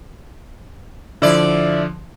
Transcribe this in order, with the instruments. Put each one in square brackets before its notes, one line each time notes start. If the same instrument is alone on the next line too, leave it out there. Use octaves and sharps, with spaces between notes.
[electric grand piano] D3 F3 [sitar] E4 D5